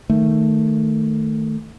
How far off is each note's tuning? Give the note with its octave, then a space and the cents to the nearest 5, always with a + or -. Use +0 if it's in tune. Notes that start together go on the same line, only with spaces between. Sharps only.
D#3 +0 A3 +5